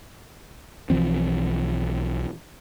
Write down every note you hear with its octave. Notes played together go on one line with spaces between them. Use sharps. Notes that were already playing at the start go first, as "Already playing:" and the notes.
B1 E3 F3 C4